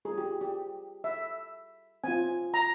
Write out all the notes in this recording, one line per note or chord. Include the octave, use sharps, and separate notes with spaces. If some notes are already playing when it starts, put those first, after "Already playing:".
G3 C4 F4 G#4
G4
G4
E5
C4 F4 G#5
A#5